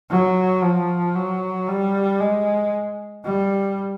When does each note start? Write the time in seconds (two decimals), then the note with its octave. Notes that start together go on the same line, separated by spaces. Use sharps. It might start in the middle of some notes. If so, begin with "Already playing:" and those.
0.10 F#3
0.62 F3
1.15 F#3
1.67 G3
2.20 G#3
3.24 G3